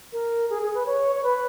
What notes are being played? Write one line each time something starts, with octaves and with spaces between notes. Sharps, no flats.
A#4
G#4
G#4
B4
C#5
C#5
B4